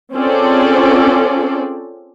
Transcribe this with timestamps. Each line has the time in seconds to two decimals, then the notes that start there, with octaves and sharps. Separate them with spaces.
0.14 C4 C#4 F4 G#4 A4 D5